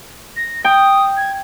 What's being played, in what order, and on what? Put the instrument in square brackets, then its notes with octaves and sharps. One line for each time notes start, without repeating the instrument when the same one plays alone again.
[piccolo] A#6
[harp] G5 [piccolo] D#6
[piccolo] G#6